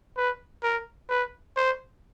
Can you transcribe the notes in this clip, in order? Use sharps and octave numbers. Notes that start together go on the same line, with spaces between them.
B4
A#4
B4
C5